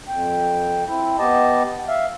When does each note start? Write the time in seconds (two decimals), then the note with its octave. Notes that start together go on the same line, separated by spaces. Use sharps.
0.08 F2 G5
0.88 C4 E4
1.18 B3 G4 D#5 A5
1.88 E5 F5